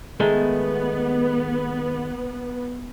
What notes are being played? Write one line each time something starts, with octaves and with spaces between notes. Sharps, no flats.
D#3 G#3 A3 B3